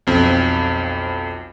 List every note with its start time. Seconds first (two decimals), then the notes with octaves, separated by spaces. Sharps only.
0.07 B1 F2 C4